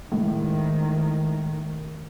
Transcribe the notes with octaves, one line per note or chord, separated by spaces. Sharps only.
A2 D#3 G#3